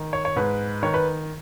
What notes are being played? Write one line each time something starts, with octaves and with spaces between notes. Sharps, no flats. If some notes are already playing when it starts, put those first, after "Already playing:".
Already playing: D#3
C#5
C#5
G#2 B4
D#3 C#5
B4